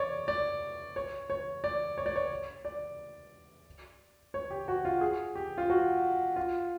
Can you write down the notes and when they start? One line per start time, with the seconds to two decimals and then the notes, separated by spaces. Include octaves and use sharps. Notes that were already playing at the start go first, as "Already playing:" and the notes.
Already playing: C#5 D5
0.28 D5
0.96 C#5
1.30 C#5
1.64 D5
1.98 C#5
2.06 D5
2.16 C#5
2.65 D5
4.34 C#5
4.51 G4
4.68 F#4
4.85 F4
5.01 G#4
5.35 G4
5.58 F4
5.70 F#4
6.36 F4